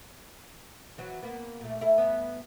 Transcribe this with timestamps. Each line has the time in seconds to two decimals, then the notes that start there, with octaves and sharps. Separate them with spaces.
0.98 E3 F#3
1.23 A#3 B3
1.61 A#2 A3
1.81 E4 A4
1.98 G2 B3